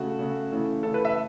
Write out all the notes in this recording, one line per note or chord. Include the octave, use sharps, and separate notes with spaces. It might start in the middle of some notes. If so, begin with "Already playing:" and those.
Already playing: C#3 A3 F#4
C#3 A3
C#3 E3 A3
C#3 E3 A3 A4
B4
E5